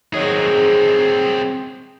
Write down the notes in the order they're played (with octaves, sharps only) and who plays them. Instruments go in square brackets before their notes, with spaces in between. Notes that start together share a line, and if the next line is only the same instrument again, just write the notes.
[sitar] D#3 F#3 G#3 [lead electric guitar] C4 G#4